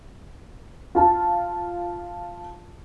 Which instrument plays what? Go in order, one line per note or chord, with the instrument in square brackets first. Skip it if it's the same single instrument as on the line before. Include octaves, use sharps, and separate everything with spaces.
[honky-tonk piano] F4 A5